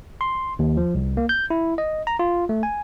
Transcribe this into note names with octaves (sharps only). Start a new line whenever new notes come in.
C6
D#2
F3
C2
A#3
G6
E4
D#5
A#5
F4
A3
G#5